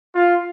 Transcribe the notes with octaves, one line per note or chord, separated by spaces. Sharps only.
F4